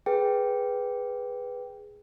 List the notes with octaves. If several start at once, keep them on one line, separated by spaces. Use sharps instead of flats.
G#4 B4 G5